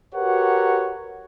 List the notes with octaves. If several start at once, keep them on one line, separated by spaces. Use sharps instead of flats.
F#4 G4 A#4 B4 C#5 F#5